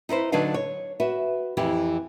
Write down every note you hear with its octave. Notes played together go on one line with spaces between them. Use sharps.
D#4 E4 B4 C5
D3 F#3 D4 D#4 B4 F5
C#5
F#4 B4 E5
F2 E3 C4 E4 G4